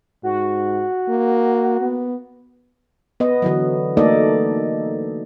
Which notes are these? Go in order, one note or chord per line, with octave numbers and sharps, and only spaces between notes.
G#2 F#4
A#3
B3
B3 D#5
D3 E3 F#3
A3 A#3 D#4 A4 D5 D#5